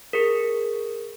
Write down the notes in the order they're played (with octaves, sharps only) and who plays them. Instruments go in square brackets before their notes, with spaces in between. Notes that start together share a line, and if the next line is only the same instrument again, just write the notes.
[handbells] G#4 A#4